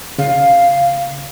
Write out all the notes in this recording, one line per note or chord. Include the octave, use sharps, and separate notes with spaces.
C#3 F5